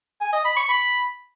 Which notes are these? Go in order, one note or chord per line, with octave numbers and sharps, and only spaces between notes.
G#5
D#5
B5
C#6
B5